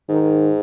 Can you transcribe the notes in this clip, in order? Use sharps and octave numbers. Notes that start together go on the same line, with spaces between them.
G#2 D#3